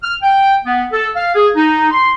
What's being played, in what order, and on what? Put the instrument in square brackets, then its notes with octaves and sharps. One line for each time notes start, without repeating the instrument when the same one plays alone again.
[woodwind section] F6
G5
B3
A4
F5
G#4
D#4
C6